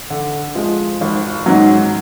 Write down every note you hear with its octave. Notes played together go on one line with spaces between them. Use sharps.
D3
F3 G#3
G#1
G#2 D#3 F#3